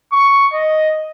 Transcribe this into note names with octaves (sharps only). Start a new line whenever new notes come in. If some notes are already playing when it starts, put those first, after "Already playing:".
C#6
D#5